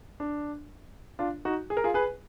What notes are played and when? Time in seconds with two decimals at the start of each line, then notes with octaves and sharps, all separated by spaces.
0.20 D4
1.19 D4 F4
1.45 D#4 F#4
1.70 G#4
1.77 A#4
1.84 F4 G#4
1.94 G#4 B4